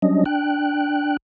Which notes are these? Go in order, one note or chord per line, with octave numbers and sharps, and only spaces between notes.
F#3 G3 C#4 D4 D#5
D4 G5 F#6